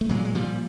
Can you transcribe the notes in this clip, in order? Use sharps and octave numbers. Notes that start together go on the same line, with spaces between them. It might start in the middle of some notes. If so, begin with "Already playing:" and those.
A3
A#2 F#3 G#3
G#3
A#2 F3 G3